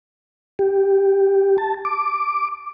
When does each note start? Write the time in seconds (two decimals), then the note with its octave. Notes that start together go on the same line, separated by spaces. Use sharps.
0.59 G4
1.58 A5
1.85 D6